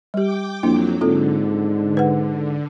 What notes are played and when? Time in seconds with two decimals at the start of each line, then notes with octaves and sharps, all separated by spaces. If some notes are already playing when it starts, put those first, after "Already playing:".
0.14 G3 G4 G5 D6
0.63 F2 F#3 A#3 D4 E4
1.01 G#2 D3 C4 F4 A4
1.97 B4 F#5